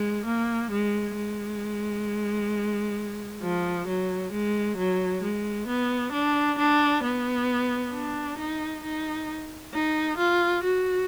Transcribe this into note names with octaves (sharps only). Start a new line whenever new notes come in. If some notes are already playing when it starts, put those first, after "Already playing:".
Already playing: G#3
A#3
G#3
G#3
F3
F#3
G#3
F#3
G#3
B3
D4
D4
B3
D4
D#4
D#4
D#4
F4
F#4